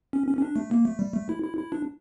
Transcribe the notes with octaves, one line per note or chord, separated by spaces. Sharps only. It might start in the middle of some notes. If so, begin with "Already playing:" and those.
C#4
C#4
C#4
D4
A3
A#3
A3
G3
A3
E4
E4
E4
D4